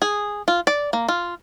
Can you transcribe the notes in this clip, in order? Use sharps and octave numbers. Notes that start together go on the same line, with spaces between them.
G#4
F4
D5
A#3
F4